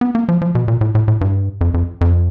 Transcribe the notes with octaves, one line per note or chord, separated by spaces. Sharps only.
B3
A#3
F3
F3
B2
A#2
A2
A2
A2
G2
F2
F2
F2